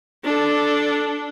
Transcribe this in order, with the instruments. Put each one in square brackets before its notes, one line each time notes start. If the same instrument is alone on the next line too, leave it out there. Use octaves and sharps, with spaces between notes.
[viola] D4 A4